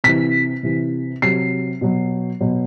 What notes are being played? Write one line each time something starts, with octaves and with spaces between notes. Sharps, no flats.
C3 E3 B6
C3 E3
C3 F#3 C7
B2 F#3
B2 F#3